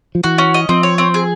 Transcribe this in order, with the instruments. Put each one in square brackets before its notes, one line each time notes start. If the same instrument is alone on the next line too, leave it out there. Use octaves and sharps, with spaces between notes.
[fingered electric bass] F3
[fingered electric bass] E3 [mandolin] F#4
[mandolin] C#4
D#5
[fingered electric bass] F3 [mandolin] C4
[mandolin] C#5
C4
G#4